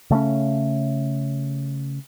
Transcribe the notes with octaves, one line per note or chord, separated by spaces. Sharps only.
C#3 A3 B3 C#4